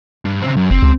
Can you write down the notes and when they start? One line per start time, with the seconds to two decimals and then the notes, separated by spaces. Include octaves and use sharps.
0.25 G2
0.42 C#3 C4
0.57 F#2
0.71 F#1 C4
0.82 C#2